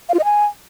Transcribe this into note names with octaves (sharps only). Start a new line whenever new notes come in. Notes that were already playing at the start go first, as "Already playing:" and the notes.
F5
F4
D#5
G#5